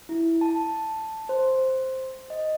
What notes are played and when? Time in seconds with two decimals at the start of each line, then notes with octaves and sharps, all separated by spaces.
0.09 E4
0.41 A5
1.29 C5
2.30 D#5